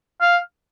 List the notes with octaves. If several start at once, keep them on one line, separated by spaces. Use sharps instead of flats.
F5